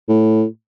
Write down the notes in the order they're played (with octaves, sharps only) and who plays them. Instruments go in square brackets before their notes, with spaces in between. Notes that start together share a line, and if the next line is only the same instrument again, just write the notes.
[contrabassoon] A2